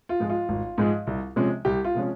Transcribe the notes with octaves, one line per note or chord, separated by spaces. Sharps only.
F4
G#2 F3 G#3
F4
G#1
G#2 F3 G#3
C2
C3 F3 G#3 C#4
C2 G4
F4
C3 F3 G#3 C#4